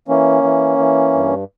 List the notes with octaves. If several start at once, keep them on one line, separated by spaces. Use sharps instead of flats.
E3 A#3 C#4
E3
E3
G2